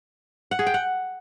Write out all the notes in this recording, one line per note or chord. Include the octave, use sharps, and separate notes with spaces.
F#5
G#4
G5
F#5